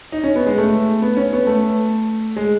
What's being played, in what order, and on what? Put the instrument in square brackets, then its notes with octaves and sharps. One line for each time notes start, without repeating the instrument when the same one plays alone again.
[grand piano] D#4
C#4
B3
G#3
A3
B3
C#4
B3
A3
G#3